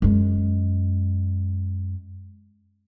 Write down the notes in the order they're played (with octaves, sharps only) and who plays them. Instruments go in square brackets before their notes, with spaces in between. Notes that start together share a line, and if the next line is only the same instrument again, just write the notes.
[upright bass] F#2 G#3